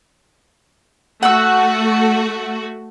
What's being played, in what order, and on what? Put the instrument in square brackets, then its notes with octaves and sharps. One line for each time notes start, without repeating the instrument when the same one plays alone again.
[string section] A3 F#4 [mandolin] F#5 E6